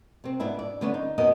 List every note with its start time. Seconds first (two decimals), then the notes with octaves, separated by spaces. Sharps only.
0.24 C3 C4
0.40 G#2 B3 D4 E4
0.59 D5
0.81 D3 A3 B3 C#4 D4
0.94 D#4
1.18 F#2 B2 B3 A#4 D#5